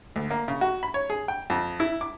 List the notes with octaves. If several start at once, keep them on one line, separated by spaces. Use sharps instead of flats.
D2
A#3
C#3
F#4
B5
C#5
G#4
G5
F2
E4
D6